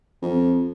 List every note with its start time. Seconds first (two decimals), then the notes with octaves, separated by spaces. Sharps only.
0.22 F2